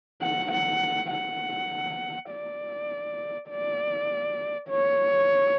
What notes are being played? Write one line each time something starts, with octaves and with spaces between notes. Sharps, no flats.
F#5
F#5
F#5
D5
D5
C#5